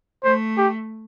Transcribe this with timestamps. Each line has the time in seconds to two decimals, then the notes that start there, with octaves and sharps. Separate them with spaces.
0.24 A3 C5
0.58 G4